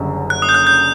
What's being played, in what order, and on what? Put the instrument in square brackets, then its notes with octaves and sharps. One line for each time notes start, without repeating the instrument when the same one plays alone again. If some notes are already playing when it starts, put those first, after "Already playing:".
Already playing: [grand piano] F#1 F#2 D3 G3
[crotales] F#6
D#6
G6
F#6
G6